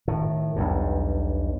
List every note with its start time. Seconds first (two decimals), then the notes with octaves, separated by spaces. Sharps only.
0.08 A2 D#3
0.56 B1 E2 G2